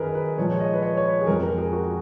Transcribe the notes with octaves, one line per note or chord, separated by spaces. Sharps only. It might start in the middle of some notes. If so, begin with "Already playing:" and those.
Already playing: F#2 D#3 F#3 G#4 A#4 B4
B4
A#2 F3 G#3 C#5
C#5
D#5
B4
C#5
C#5
B4
G#4
F2 F3 G#3 A#4
A#4
G#4
F#4